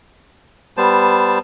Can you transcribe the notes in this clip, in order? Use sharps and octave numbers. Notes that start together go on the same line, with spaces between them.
G3 B3 C5 A5